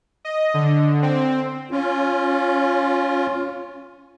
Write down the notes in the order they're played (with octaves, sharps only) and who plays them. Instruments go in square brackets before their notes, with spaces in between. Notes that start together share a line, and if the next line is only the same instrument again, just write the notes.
[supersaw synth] D#5
D3
C4
[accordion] C#4 F4